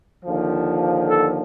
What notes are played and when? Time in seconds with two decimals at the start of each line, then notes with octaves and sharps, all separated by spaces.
0.25 D#2 D3 F3
1.08 A4